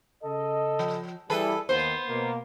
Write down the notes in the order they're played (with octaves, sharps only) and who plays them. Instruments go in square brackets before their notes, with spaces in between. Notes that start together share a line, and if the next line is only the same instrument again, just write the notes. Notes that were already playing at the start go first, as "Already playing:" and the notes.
[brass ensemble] C#3 A4 D#5
[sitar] F3
[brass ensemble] E3 G3 [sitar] G#4 A4 B4
[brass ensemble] D#2 [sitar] B3 C5
[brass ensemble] B2 A#3